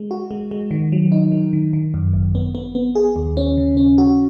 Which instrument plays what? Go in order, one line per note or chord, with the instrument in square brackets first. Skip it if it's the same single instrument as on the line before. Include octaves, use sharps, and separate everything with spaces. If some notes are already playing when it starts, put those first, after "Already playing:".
Already playing: [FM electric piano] G#3
F#4
G#3
G#3
D#3
F#3
D#4
F#3
D#3
D#3
F#2
G#1
B3
B3
B3
G#4
D#2
C#4
C#3
C#4
F#4